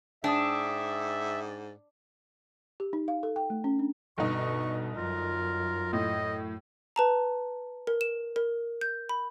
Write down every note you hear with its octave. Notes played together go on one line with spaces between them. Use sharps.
G#2 D4 E5 G5 D#6
G4
D#4
F5
A4
G5
A3
C#4
D4
G1 B2 D#4 C#6
F#2 F4 A#4
A2 D#5
B4 A5 A#5
A#4
E7
A#4
G6
B5